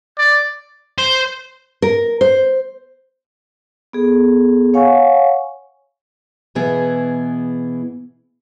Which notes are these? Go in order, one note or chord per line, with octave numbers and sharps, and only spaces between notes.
D5
C5
A#4
C5
B3 G#4 A4
C#5 F5 F#5 G#5 C#6
B2 E3 B3 E4 G#4